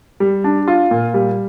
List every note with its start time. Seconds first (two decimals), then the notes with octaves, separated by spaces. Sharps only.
0.20 G3
0.44 D4
0.68 F4
0.91 A#2
1.14 G3